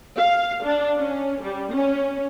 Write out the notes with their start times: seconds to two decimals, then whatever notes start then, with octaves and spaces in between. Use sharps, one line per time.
0.17 F5
0.63 D4
0.98 C#4
1.42 G3
1.72 C#4